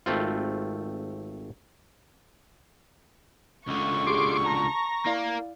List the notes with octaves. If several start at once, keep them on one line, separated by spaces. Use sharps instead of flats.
G#1 A3 C4 F4
C#2 D3 C#6
G4 G#4 C6 D6
A5 A#5
A#3 E4 D5 F5